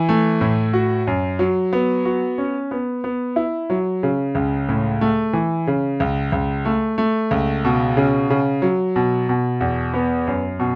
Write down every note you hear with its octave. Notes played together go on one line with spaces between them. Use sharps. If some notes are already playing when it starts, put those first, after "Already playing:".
Already playing: E3
A3
A2
F#4
F#2
F#3
B3
F#4
C#4
B3
B3
E4
F#3
C#3
C#2
A2
A3
E3
C#3
C#2
C#2
A3
A3
C#2
B2
C#3
C#3
F#3
B2
B2
E2
B3
F#2
B2